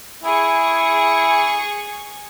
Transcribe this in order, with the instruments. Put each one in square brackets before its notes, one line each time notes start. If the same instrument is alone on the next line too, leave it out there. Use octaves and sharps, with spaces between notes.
[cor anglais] E4 [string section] G#4 C#6